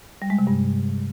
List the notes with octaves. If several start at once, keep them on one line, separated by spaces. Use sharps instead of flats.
G3
G#3
C3
G2